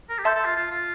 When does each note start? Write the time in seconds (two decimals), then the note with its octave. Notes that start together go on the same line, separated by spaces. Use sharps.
0.09 A#4
0.18 G4
0.24 A4 E5 A5 C6 G6
0.35 A4
0.45 F4
0.55 F4
0.71 F4